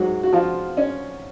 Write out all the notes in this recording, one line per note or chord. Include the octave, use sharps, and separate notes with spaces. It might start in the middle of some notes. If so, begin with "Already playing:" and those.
Already playing: G#2 F#3 F#4
F#4
F3 F4
C#4